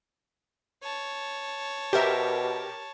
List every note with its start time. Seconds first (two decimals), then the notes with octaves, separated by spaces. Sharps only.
0.83 C#5 A5
1.93 B2 G4 A#4 C5 E5